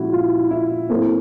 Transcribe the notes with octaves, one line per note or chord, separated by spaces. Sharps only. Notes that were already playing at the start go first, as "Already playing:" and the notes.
Already playing: A#2 F3 G#3 C#4 E4 F#4
F4
E4
A2 F#3 A3 A#3 C4